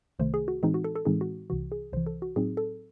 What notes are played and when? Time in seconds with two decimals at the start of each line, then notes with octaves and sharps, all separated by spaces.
0.19 C2 C3 D#3 A3 C5
0.34 G#4
0.48 F#4
0.63 A2 E3 G#3 C4 D#4 G#4
0.74 F#4
0.84 A4
0.95 A4
1.05 A2 E3 G#3 C4 D#4 G#4
1.21 F#4
1.50 C2 C3 E3 F#4
1.72 G#4
1.92 C2 C3 E3 C5
2.07 A4
2.22 F#4
2.36 A2 F#3 C4 D#4 G#4
2.57 A4